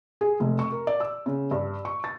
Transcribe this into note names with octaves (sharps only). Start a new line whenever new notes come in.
G#4
F1
C#6
A#4
D5
E6
C#3
G2
C#6
A6